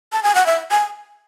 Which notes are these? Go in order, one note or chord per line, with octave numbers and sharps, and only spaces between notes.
A5
G#5
F#5
E5
G#5